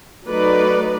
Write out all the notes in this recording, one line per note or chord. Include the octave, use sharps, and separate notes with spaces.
F#3 A3 D#4 B4 D5